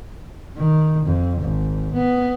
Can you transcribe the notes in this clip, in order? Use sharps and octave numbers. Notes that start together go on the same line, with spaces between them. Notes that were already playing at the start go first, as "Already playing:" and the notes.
D#3
F2
G#1
B3